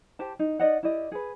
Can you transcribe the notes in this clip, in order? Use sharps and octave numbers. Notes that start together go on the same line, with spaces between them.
G4 C5 A5
D#4
D#4 D5 D#5 F#5
E4 G4 D5 D#5
G#4 B4